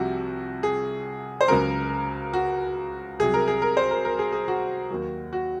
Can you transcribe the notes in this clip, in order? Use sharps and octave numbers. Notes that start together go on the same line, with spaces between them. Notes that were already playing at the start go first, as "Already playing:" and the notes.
Already playing: C2 C3 F3 F#4
G#4
C5
C#2 C#3 F#3 A#4
F#4
C2 C3 F#3 G#4
A#4
G#4
A#4
C5
A#4
A#4
G#4
G#4
F#4
D#2 D#3 F#3
F#4